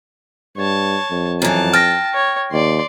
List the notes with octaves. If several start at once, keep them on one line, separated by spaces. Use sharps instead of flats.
G2 C#5 A5
F2
F#2 E3 A5
G5 F6 A6 A#6
C#5
D#2 D5 C6